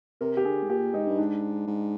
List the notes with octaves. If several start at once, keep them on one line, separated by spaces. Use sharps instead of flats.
C3 A#4
G4
D3 G#4
G#2
A#2 G4
G#2 D#4
G2
G#2 D4
G#2